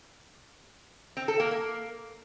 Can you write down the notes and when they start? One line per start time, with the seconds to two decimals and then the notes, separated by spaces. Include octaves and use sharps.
1.17 C4
1.28 A4
1.40 A#3
1.51 A#3